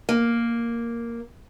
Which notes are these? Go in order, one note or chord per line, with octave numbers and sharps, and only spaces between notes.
A#3